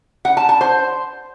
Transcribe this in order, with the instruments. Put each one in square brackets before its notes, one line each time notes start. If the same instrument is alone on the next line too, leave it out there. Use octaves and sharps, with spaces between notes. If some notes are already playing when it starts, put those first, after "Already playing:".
[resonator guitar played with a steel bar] F#5
A5
A5
C5